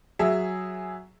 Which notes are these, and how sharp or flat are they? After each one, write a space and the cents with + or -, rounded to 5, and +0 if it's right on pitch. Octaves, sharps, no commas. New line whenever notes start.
F#3 +0 G#4 +0 E5 +5